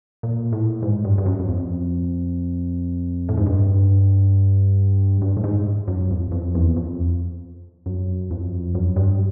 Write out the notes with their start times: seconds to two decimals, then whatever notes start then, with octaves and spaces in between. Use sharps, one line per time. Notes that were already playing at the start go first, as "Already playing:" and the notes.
0.23 A#2
0.53 A2
0.83 G#2
1.05 G2
1.18 G2
1.26 F#2
1.39 F#2
1.48 F2
3.29 A2
3.37 G#2
3.46 G2
5.22 G2
5.37 A2
5.44 G#2
5.88 F#2
6.11 F2
6.32 F2
6.55 E2
6.77 F2
7.86 F#2
8.31 F2
8.75 F#2
8.96 G2